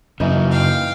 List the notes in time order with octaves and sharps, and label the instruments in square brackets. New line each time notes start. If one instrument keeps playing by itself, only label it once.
[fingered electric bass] F#2 [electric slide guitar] C#3 A#3 [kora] E3 D#4
[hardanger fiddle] F5 G5